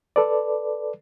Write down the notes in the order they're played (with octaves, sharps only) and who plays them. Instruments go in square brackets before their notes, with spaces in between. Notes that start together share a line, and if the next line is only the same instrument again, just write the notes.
[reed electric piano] A4 B4 D5